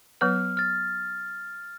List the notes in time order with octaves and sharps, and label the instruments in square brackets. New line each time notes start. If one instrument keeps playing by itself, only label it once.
[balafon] F#3 B3 B4 [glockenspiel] F6
[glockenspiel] F6 A6